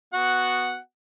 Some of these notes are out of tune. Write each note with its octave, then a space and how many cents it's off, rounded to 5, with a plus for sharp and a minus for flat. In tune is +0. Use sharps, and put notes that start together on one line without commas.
B3 +0 F#4 +0 F#5 +0